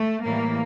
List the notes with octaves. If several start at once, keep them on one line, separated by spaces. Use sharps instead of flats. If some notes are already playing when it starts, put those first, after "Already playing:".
Already playing: A3
A2 E3 G3 A#3